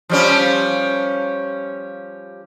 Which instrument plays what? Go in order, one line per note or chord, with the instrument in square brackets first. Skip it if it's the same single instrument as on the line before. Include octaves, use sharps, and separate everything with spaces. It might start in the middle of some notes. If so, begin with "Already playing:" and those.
[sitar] F3 G3 C#4